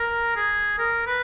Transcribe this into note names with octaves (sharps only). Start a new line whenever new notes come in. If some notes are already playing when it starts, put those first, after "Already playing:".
Already playing: A#4
G#4
A#4
B4